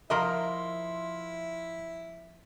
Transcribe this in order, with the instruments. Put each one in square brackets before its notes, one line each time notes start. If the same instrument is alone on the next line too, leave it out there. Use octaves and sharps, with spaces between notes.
[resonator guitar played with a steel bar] F3 A#4 D#5 [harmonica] E4 [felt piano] E5 C6 F6